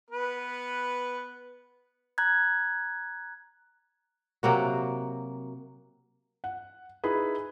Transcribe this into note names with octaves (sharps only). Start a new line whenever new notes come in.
B3 B4
A#5 F#6 G#6
C3 F#3 A#3 F#4
F#5
D#4 E4 G#4 B4